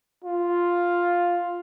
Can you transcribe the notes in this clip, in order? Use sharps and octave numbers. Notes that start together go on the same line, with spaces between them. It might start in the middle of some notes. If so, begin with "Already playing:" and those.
F4